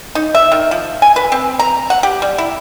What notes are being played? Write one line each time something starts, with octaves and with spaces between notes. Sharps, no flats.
D#4
E5
D#3
F3
G#5
B4
C4
A#5
F#5
G4
G3
E4